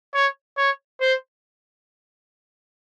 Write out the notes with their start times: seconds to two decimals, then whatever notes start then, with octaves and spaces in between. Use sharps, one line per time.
0.14 C#5
0.57 C#5
1.01 C5